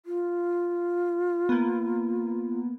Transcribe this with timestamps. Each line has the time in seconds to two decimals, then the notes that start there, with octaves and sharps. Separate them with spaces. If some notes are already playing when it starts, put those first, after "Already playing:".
0.06 F4
1.49 A#3 B3